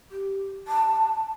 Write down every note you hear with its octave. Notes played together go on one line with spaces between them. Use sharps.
G4
A5